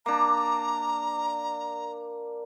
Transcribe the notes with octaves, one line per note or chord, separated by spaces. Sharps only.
A#3 D4 A#5